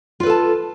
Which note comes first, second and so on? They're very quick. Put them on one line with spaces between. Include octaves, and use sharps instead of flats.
F4 B4 A4 A5